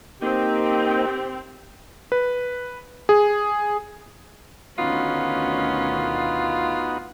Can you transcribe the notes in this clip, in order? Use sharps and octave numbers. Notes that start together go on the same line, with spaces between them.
A#3 C4 D#4 G4
B4
G#4
D2 B2 D#3 B3 C#4 D#4 F4 F#4